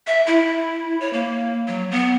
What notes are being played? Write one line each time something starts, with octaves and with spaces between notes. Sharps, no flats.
E5
E4
C#5
A#3
F#3
B3